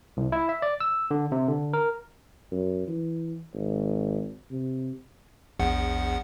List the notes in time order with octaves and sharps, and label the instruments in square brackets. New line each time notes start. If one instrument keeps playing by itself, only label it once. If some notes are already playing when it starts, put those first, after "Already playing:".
[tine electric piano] C2
E4
E5
D5
E6
D3
C3
D3
A#4
[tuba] F#2
E3
G#1
C3
[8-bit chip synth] A#1 E2 F#5